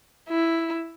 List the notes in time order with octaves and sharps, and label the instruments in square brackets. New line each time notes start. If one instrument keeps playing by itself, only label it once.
[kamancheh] E4